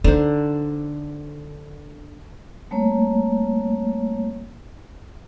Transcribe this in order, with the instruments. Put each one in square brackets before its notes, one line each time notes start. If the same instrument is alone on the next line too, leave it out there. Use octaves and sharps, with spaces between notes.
[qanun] D3 C5 [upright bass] D#4
[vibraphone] G3 A3 A#3 C4 C#5